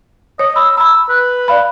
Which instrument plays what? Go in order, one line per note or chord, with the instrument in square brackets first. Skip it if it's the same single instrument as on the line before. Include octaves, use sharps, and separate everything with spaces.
[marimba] C#5 [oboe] D#5
[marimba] B5 [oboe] E6
[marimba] A#5 B5 [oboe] E6
[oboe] B4
[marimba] D5 F5 B5